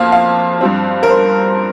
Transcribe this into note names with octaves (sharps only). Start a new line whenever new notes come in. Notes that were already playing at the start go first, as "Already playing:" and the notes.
Already playing: F2 F3 A#3 F5
F5
G2 F3 C4
A#4
C5